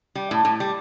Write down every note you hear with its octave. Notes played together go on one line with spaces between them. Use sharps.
G3
A2
A2
G3